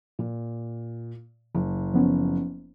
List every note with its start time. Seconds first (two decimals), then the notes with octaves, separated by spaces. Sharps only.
0.19 A#2
1.55 F#1
1.94 F3 B3 C#4